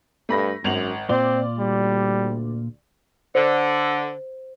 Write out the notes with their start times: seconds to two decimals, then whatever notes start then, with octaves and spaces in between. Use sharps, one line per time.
0.29 G2 A3 B5 A#6
0.64 G#1 F#2 F7 F#7
1.09 A#2 C4 F4 D5
1.59 D2 G3
3.35 D3 C5